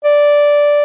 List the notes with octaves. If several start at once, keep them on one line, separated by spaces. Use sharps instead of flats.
D5